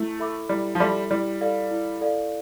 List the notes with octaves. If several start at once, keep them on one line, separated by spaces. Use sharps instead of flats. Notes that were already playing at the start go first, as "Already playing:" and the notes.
Already playing: A3 E4
A4 E5 B5 D6
G3 E4
F3
G3 A4 E5 B5 D6
G3 E4
A4 D5 F5
E4
A4 D5 F5